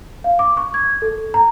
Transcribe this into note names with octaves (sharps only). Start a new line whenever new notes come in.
F5
D6
C#6
G#6
A4
A#5